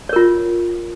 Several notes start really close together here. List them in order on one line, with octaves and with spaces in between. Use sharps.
C#5 A#4 F4